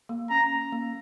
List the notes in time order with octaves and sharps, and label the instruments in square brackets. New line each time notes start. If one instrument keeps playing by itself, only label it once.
[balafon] A#3
[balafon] C#4 [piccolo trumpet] A#5
[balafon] A#3